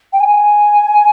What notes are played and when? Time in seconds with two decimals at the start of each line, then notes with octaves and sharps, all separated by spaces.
0.13 G5
0.20 G#5